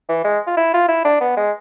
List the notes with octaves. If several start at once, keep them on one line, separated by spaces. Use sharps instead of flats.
E3
G#3
F4
E4
F4
E4
D4
B3
G#3